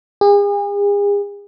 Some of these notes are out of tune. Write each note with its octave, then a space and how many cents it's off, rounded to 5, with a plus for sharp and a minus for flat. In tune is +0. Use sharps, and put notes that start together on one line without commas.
G#4 -40